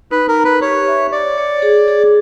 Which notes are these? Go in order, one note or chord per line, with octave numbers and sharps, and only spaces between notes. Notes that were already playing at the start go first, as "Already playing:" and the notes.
D#4 B4
A#4
D#4
B4
G4 C#5
E5
C#5 D5
C#5
G#4
G#4